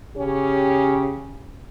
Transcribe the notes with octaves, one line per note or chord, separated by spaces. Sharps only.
C#3 C#4 G4